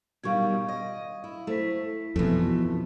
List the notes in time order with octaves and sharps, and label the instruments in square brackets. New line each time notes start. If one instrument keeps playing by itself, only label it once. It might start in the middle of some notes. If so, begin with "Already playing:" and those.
[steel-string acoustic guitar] B2 D#3 G3 [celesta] F5 C#6 G#6
[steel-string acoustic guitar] D#5
E4
[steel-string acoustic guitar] A3 [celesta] E4 C5 B6
[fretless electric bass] F2 B2 [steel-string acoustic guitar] E3 F3 A3